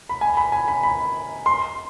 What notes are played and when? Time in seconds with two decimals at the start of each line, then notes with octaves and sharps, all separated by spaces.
0.09 B5
0.21 G#5
0.37 B5
0.52 G#5
0.68 B5
0.83 B5
1.46 C6